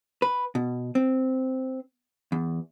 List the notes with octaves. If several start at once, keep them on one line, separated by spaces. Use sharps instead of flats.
B4
B2
C4
E2